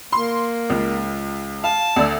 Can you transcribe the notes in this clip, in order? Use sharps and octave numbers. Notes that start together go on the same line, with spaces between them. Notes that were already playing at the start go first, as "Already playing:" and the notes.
A#3 C6
C#2
F5 A5
D2 D5 E6